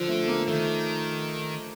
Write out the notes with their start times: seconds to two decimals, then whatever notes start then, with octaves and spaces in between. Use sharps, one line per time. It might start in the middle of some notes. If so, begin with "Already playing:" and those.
Already playing: D3 F3
0.09 A3
0.28 A#3
0.48 D#3 A3